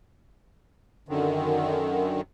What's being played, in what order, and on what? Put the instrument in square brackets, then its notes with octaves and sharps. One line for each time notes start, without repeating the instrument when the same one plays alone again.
[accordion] F#2 D3 D#3